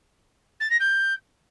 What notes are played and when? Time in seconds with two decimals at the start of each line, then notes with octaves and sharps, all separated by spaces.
0.60 A6
0.70 A#6
0.80 G6